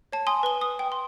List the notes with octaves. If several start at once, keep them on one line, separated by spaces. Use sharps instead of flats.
C#5 A5
G#5 C6 D#6
B4 G7
D#6
G5
C6